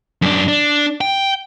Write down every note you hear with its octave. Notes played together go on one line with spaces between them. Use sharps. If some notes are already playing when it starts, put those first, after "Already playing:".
F#2 D4
D4
G5